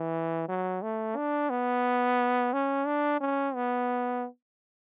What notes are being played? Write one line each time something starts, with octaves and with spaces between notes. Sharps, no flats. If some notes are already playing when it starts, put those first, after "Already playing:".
Already playing: E3
F#3
A3
D4
B3
C#4
D4
C#4
B3